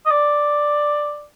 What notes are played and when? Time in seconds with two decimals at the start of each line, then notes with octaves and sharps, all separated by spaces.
0.06 D#5
0.11 D5